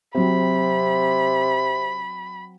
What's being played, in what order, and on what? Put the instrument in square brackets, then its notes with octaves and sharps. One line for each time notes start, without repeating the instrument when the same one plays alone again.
[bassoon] C3 [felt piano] F#3 C4 [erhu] B5